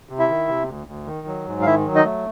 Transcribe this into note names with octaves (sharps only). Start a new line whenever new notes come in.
C3
E4 E5
D#3
C3
D2
D2
D#3
F#3
G#2
F5
D#3 E4 E5
F#3
D#4 D#5
A3